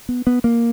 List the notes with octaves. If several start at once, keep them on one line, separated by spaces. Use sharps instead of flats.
B3
B3
A#3